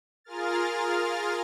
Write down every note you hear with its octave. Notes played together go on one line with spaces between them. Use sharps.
F4 G#4 A#4 F6 A6